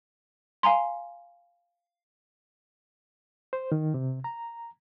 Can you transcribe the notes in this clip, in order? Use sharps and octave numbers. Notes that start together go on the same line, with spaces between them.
F5 G#5 A#5 C6
C5
D#3
C3
A#5